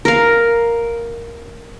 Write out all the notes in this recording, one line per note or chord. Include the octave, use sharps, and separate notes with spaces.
A#4 F5